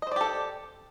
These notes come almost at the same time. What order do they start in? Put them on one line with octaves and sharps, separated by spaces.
D#5 C5 D5 G4 A4